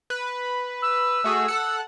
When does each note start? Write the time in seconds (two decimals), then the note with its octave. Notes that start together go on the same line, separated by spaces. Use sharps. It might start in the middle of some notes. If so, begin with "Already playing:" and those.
0.10 B4
0.82 E6
1.24 A3 F#4 G#4
1.48 A4 F#5